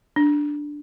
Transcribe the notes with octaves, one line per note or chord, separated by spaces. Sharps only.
D4